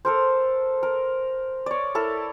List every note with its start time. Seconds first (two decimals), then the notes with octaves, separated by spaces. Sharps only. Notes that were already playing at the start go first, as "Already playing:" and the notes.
0.05 A4 A#4 C5
0.83 A#4
1.66 C#5 D5
1.95 E4 A4 A#4